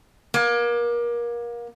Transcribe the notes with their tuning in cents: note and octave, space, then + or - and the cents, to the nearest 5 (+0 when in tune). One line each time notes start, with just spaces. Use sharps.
A#3 +30